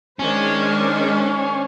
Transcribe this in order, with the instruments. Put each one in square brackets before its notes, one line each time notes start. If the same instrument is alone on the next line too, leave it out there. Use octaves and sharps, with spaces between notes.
[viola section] D#3 D4 C5 [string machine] G#3 [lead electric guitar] C#4